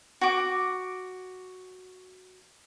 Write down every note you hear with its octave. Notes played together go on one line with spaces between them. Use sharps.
F#4 D6